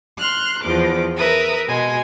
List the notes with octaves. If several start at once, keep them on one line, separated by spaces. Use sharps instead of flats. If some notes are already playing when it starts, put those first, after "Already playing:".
C6 F6 F#6
E2 F3 D6
A#4 B4 E5 D#6
B2 G#3 G#5